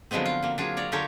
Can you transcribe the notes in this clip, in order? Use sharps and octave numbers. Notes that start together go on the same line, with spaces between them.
D3 F3 F#3 G#3 B3 C4
F4
F#3 A#3
F#3 D4 F4 G#4
C#5 D5 A#5
D3 F4 G4 A4 A#4 C#5